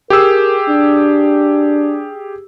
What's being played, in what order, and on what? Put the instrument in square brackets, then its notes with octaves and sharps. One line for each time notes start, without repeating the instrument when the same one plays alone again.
[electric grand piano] G4 G#4 E6 [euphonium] A#4
[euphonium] D4